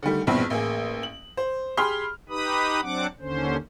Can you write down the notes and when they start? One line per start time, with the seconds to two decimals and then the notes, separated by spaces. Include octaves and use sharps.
0.03 D3 D#3 G3 A3
0.27 A#1 E2 G2 B2 C4 B5
0.50 A1 A#3 G#4
1.03 F#7
1.37 C5
1.77 G4 G#4 B5 C6 F6
2.29 D#4 G4 B4 B5 D#6
2.81 F#3 C4 D4 F#5 D6
3.20 D#2 D3 C#4 C5